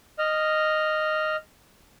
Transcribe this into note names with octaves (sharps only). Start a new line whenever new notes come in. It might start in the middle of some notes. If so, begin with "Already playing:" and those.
D#5 F6